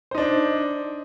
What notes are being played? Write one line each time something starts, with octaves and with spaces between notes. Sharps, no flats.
D4 D#4 C5